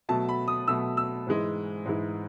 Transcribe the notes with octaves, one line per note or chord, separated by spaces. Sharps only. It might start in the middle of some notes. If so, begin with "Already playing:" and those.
B2 F#3 A3 A5
B5
D#6
B2 F#3 A3 E6
E6
G#2 E3 G#3
G#2 E3 G#3